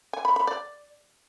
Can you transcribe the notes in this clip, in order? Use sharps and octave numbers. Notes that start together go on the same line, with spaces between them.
G#5
B5
B5
D5